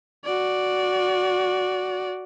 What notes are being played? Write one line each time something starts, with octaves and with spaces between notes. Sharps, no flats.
F#4 D5